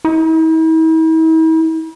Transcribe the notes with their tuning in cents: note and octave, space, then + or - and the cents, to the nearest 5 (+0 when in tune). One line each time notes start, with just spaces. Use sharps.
E4 -45